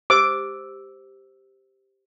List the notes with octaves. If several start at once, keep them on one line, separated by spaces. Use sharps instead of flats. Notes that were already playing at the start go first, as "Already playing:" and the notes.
G4 C5 D6 E6